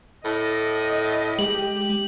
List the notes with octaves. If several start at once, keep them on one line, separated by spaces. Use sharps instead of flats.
A2 D#5
G#3 G4 F#7